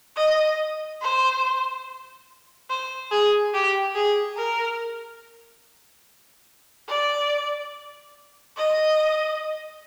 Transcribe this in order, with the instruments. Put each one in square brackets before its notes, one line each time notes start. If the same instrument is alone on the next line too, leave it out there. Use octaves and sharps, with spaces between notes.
[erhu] D#5
C5
C5
G#4
G4
G#4
A#4
D5
D#5